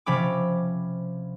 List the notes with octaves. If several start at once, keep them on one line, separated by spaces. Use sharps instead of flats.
C3 F3 C#4 B5 D6